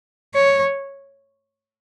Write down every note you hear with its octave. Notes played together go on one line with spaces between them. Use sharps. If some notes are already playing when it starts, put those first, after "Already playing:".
C#5